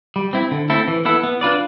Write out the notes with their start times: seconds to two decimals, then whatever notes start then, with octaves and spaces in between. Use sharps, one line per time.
0.16 G3
0.33 C4 E4
0.51 D3
0.70 A3 C4 E4 A4
0.88 E3
1.05 B3 E4 A4
1.24 B3
1.41 D4 F4 B4 D5